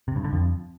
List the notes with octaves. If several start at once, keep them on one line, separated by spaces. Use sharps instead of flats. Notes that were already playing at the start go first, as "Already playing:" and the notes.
C3
G2
D3
F2